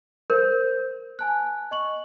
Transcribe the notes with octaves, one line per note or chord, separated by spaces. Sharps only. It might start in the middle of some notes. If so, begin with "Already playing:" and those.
A#4 C5 G6
G#5 A5 F#6
D#5 C#6 F#7